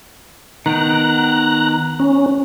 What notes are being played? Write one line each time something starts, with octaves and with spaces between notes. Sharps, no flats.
D#3 B3 G5 A#5 F#6
C#4